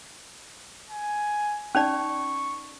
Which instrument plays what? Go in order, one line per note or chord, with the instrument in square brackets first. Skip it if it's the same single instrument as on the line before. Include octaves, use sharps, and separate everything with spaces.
[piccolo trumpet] G#5
[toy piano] C#4 D#4 D5 [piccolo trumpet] C#6